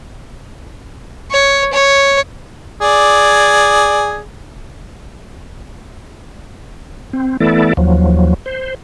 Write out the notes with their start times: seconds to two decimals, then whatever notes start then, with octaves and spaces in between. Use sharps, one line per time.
1.31 C#5
1.73 C#5
2.81 G#4 D5
7.13 C4
7.40 E3 A3 B3 E4 A4 D5
7.77 D#2 F3 F#3
8.46 C5